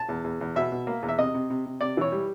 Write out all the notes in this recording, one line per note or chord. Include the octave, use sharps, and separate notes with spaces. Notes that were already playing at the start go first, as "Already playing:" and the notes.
Already playing: A5
E2
E2
E2
B2 E5
B2
A#3
E2
E5
C3 D#5
C3
C3
C3
C3 D5
E3 C#5
G3